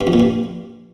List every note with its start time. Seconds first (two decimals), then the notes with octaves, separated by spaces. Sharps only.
0.01 G2
0.07 F2
0.13 A#2
0.20 G2